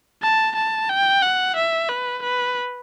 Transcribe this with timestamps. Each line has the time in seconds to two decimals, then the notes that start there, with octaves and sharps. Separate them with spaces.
0.23 A5
0.56 A5
0.89 G5
1.22 F#5
1.56 E5
1.89 B4
2.23 B4